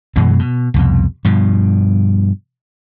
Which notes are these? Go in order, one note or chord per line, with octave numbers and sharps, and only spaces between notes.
F#2 B2 E3 G#3
B2
C2 F2 B2
G2 B2 F3